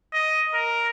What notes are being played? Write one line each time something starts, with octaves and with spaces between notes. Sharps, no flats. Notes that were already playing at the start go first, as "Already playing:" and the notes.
D#5
A#4